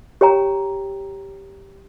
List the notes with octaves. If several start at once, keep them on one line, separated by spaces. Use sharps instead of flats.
G4 C#5 G5 A#5